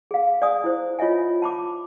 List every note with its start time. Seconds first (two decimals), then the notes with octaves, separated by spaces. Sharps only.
0.11 G#4 F5
0.42 D5 G#5 D#6
0.64 E4 C5
0.99 F4 C#5 D#5 E5 G#5
1.42 A5 B5 D6